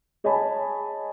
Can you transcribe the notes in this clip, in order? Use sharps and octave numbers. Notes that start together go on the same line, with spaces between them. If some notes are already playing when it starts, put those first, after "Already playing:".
G#4 C#5 D#5 G#5 A5 B5